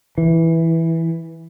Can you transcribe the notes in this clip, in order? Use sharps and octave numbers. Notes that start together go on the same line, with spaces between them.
E3